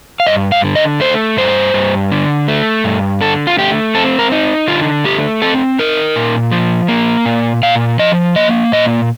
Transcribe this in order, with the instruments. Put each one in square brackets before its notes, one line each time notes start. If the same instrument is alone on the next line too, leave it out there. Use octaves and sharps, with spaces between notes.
[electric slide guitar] F5
G2 D#5
F5
D3
D#5
A3 C5
G2 C5
G2
D3
A3
G2
D3 A4
F4
A3 G4
C4 A4
A#4
D#4
D3 F4
A3 G4
C4 A4
D#4 A#4
A#2
F3
A#3
A#2
A#2 F5
F3 D#5
A#3 D#5
A#2 D#5